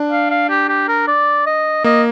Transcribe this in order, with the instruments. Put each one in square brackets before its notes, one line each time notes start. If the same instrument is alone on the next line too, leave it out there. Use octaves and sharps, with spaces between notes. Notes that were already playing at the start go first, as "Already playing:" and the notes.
Already playing: [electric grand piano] D4
[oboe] F5
F5
G4
G4
A#4
D5
D#5
[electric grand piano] A#3 [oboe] D#5